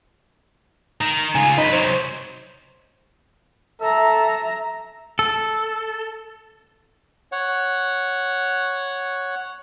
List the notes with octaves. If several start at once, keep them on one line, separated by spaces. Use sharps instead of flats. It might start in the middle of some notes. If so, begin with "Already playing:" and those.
D#3 A#5
C#3 F4 G#5
F#2 D#4 B4
C3 F#3 C5
A4 E5 A#5
A4
C#5 F#5